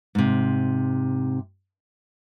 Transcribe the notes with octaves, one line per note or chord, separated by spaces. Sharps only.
G#2 C3